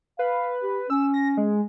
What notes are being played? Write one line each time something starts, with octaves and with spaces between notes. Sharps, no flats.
B4 F5
G4
C#4 E6
A#6
G#3